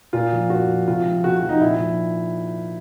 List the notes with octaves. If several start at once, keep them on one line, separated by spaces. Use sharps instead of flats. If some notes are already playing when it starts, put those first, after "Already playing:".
A#2 F4
F3
A#2 F#4
F3
C3 F4
F3
C3 F#4
F#4
F3
D#4
A#2 E4
F3